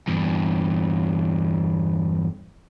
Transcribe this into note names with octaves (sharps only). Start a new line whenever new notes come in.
E2 G2